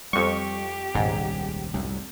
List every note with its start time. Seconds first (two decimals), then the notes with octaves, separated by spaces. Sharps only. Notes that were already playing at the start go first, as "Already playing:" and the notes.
0.13 F2 G3 G4 C#6
0.95 D#1 C2 G#2
1.74 C2 F#2 A2